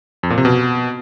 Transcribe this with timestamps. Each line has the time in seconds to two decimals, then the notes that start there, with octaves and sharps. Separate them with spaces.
0.23 F2
0.30 A#2
0.38 C3
0.45 B2